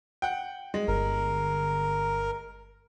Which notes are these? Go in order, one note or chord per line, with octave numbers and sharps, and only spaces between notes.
F#5 G5
G#3
G1 A#4